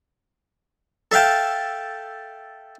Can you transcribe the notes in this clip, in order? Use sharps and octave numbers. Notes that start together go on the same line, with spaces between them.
A4 E5 F5 G5 A5